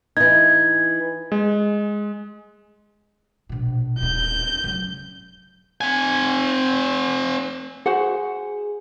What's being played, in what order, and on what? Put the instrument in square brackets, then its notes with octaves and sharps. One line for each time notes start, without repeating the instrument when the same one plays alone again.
[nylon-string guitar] E3 D#4 [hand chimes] G#6
[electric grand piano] G#3
[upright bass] A#1 B2
[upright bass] D#1 B3 [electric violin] G6
[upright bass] C#3 F#3
[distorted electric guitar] C4 G#5
[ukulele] F#4 C5 F#5 [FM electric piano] G#4